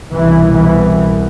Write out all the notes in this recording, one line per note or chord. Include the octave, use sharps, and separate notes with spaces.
C2 B2 E3
E3